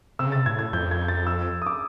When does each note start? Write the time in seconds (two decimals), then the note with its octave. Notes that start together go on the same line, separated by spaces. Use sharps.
0.19 C3 E6
0.27 C#3
0.32 C3 A6
0.46 A2 G#6
0.59 G#6
0.73 F2 G6
0.91 G#6
1.08 A6
1.27 E6
1.62 D#6
1.66 D6